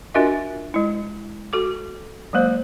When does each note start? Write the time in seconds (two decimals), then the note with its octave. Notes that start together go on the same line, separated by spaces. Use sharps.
0.14 D4 F4 F#4 A#4 D#5 E5
0.74 G#3 E4
1.53 F#4 A4 D6
2.33 F#3 G#3 A#3 C5